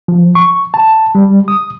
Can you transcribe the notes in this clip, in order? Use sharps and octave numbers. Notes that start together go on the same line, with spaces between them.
F3
C#6
A5
G3
D#6